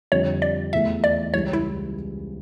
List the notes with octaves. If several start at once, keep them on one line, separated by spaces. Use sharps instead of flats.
F2 D3 G3 C#5
D5
E2 E3 A3 E4 E5
D5
C#2 C#3 E3 G3 C#5
E4